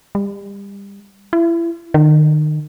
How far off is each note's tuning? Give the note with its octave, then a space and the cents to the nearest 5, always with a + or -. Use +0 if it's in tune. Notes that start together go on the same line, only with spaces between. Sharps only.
G3 +30
E4 +30
D#3 -35